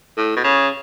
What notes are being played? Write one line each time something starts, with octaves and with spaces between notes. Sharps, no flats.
A2
B2
C#3